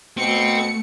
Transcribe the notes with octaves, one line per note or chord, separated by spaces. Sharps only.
B2 A3 C4 C#7